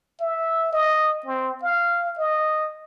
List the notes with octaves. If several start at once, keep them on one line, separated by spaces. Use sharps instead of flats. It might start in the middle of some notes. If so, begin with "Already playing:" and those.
E5
D#5
C4
F5
D#5